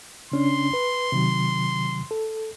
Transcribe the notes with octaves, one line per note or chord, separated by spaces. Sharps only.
C#3 C#4 D4 C6
B4
C3 D#3 F#3
A4